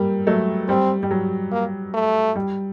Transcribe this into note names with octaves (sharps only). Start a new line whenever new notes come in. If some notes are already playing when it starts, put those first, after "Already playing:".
Already playing: G3 A#3
F#3 A3
G3 C4
G3
F#3
A#3
A3
G3